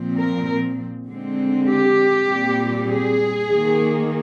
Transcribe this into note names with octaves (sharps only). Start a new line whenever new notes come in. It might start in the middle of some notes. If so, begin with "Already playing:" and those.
Already playing: A#2 F3 C4
A#4
D3 G#3 C4
G4
A#2 G3 C4
G#4
D#3 A#3